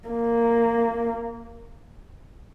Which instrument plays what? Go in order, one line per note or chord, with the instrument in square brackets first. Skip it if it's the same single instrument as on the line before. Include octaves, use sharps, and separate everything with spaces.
[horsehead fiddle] A#3